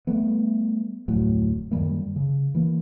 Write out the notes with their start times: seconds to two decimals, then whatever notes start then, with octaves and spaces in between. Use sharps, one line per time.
0.07 G3 A3 B3
1.08 D1 F2 A2 F#3
1.71 F#2 D#3 G3 A#3
2.16 C#3
2.55 E3 A#3